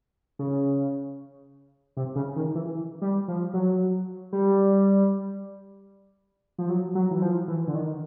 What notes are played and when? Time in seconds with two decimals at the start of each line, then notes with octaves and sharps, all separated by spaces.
0.39 C#3
1.97 C3
2.16 C#3
2.36 D#3
2.55 E3
3.02 G3
3.28 F3
3.54 F#3
4.33 G3
6.58 F3
6.69 F#3
6.95 F#3
7.11 E3
7.22 F3
7.48 E3
7.68 D3
7.75 D#3